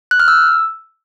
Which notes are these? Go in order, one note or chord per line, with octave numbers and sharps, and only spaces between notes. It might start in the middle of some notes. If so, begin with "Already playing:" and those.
F#6
F6
E6